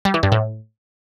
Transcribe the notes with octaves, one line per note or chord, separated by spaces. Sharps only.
G3
E3
G2
A2